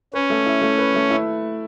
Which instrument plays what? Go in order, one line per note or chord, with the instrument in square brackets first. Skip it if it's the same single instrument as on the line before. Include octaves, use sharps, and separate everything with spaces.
[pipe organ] C#4 [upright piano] B4
[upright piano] A3
E4
A3
B4
A3
E4